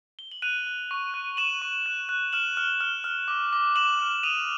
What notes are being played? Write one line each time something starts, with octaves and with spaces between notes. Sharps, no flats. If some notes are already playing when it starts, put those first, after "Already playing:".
G7
F#7
F#6 D#7 F7
F#6
C#6
F#6
C#6 E7 F#7
C#6
F#6
F#6
F6 E7 F#7
F6
F6
F6
D6
D6
D6 E7 F#7
F6
D#6 D#7 F7